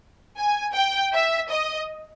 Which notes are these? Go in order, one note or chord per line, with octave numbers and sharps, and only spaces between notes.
G#5
G5
E5
D#5